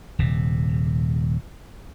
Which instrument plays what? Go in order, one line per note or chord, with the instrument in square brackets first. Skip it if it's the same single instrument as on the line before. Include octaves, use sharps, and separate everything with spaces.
[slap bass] D#1 C3